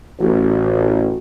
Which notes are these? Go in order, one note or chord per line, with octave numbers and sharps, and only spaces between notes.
A1 F#4